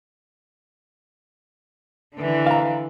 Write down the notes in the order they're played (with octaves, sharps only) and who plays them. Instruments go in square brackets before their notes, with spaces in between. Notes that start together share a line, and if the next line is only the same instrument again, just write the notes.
[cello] D3 E3
[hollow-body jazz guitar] F5 A#5